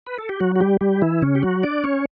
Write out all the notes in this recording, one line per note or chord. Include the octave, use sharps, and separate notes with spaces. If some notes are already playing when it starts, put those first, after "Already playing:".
B4
A4
G4
F#3 F#4
F#4
G3 G4
G3 G4
E3 E4
C#3 C#4
G4
F#3 F#4
D4 D5
C#4 C#5